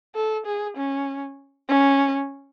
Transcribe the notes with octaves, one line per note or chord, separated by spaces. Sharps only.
A4
G#4
C#4
C#4